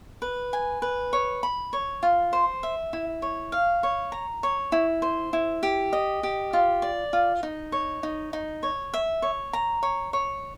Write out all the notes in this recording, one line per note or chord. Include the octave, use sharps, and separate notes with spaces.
B4
G#5
B4
C#5
B5
C#5
F4
C5
E5
E4
C#5
F5
C#5
A#5
C#5
E4
C5
E4
G4
D#5
G4
F4
D5
F4
D#4
C#5
D#4
D#4
C#5
E5
C#5
A#5
C#5
C#5